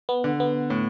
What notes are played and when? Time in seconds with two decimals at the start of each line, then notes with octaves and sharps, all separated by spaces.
0.09 B3
0.24 D3
0.40 B3
0.70 A2